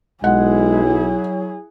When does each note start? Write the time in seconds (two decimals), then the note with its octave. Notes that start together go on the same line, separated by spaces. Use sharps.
0.24 B1 G#3 E4 G#4 F#5
0.83 F#3